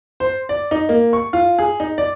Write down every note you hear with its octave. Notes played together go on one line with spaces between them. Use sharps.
C5
D5
D#4
A#3
C#6
F4
G#4
D#4
D5